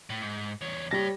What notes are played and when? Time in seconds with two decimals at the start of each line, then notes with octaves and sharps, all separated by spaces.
0.10 A2
0.22 G#2
0.61 E2 C#5
0.91 G3 C#5 A5 A#6